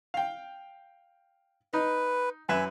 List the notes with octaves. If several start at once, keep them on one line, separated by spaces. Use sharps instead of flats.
F5 G5
D#4 B4
F#2 B4 E5 G#5